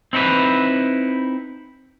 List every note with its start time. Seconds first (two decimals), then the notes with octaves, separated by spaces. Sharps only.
0.13 C4 D#4 E4 B4